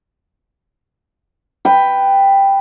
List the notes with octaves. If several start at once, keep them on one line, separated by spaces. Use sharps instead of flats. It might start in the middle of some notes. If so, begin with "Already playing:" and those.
B4 G5